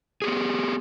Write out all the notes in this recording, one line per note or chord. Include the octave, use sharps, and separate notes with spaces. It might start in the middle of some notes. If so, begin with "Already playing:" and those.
B3 G4 G#4